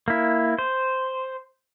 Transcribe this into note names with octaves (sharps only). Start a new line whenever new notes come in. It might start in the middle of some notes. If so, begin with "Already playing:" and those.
A#3 E4
C5